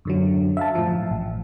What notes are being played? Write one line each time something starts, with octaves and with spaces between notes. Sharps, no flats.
F#2 D3 F#3
E5 F5 A5
A2 F3
A1